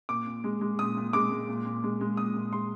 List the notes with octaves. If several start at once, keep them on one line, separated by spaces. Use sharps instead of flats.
A#2 D6
A#2
G#3
G#3
A#2 D#6
A#2
G#3 D6
G#3
A#2
A#2
G#3
G#3
A#2 D#6
A#2
G#3 C6